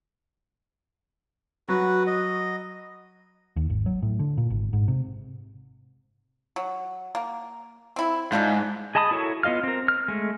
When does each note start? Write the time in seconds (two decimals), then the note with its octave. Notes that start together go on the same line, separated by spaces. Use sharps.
1.69 F#3 F#4 B4
2.07 D#5
3.56 D#2
3.70 G#1
3.86 F#3
4.02 A2
4.19 D3
4.38 A#2
4.50 G#1
4.73 G#2
4.88 C3
6.56 F#3
7.15 A#3
7.96 C4 E4
8.32 G#2 G3 D4 F4
8.95 G#4 D#5 A5 B5 D#6
9.11 E4 F#4 A4 A#4 C#5
9.43 B3 F4 D#5 F5 F6
9.63 C4 A#4
9.88 F6
10.08 G#3 A3